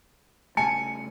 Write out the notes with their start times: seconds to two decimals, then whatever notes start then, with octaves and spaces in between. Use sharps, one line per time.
0.57 C#3 A3 G#5 A5 C#7